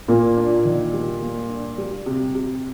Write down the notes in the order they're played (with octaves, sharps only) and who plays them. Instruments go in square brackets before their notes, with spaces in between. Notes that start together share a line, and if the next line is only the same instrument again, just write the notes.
[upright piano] A#2 [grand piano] A#3
[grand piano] D4
D#3
G3
A#3
D4
G3
C3
C3